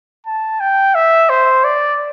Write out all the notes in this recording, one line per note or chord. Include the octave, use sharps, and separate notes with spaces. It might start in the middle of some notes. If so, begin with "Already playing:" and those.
A5
G5
E5
C5
D5